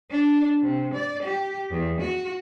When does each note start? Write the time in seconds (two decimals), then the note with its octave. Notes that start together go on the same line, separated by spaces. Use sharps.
0.11 D4
0.62 C3
0.94 D5
1.23 G4
1.71 E2
2.01 F#4